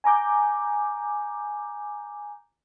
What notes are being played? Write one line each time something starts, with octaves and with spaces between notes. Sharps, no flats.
G#5 A#5 D6 G6